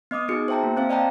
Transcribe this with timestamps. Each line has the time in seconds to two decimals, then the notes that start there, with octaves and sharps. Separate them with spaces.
0.11 B3 D#5 D6 D#6
0.28 B3 D#4 F#4 G#4 C#7
0.48 C5 E5 G5 A5 A#5
0.63 A#3
0.77 C4 C5 F5
0.89 D5 D#5 F5 G5 A5 A#5